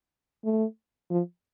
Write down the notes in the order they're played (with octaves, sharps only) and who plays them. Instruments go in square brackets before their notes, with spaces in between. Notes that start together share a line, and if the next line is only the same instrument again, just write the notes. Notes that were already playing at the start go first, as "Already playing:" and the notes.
[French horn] A3
F3